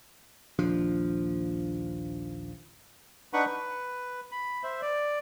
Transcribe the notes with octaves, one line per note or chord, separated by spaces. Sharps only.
A#1 D#2 F3 D4
D4 D#4 B4 F#5 B5 C#6
B4
B5
C5 E5
D5